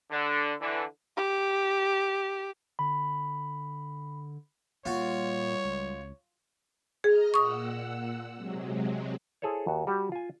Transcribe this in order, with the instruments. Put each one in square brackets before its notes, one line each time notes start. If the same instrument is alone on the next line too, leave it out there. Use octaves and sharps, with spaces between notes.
[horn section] D3
D3 E3
[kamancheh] G4
[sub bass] D3 [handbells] B5
[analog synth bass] A#2 [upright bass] G3 [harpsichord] F4 F#4 [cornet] C#5
[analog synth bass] C#2
[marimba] G#4 [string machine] D#5 A#5 F6
[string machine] A#2 F#5 E6 [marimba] C#6 D#6
[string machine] C3 F#3 G#3
[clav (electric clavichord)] E4 G#4 A4 C5 C#5
D#2 F#4
G3 F#4 G4
F4 G#5